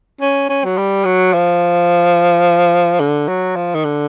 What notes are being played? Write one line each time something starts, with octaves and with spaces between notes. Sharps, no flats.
C#4
C#4
F#3
G3
F#3
F3
D3
F#3
F3
D#3
D3